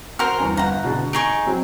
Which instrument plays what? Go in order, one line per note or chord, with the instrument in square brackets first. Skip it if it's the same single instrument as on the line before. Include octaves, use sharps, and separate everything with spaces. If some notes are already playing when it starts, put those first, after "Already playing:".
[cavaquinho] F#4 A#4 C5 [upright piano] F6
[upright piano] E2 G2 G#5
[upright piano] G1 [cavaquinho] F#5 A#5
[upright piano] B2 D3 G#3
[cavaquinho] D#4 G#4 C#6 [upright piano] D7
[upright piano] F#3 G#3 C4